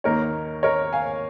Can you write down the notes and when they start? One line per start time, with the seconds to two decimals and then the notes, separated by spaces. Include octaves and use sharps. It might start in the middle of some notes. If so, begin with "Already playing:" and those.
0.04 D#2 D#3 A#3 A#4 C#5
0.63 A#4 C#5
0.93 F5 G#5